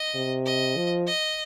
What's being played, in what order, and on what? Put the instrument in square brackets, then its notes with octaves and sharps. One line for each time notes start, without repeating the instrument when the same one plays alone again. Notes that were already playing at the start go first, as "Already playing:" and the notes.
Already playing: [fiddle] D#5
[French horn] C3
[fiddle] D#5
[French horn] F3
[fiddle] D#5